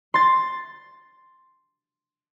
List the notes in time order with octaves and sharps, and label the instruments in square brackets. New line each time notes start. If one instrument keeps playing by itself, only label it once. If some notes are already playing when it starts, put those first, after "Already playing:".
[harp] C6 A6